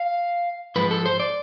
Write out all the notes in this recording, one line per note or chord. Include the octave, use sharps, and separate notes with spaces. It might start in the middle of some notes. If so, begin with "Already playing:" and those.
Already playing: F5
G#2 F3 G#3 B4
A4
C5
D5